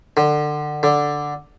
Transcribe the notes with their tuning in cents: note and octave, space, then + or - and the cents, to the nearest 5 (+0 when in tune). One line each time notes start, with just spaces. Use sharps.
D3 +25
D3 +0